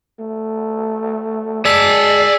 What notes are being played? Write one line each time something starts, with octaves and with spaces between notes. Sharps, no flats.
A3
G#3 G#4 D5 A5 E6 B6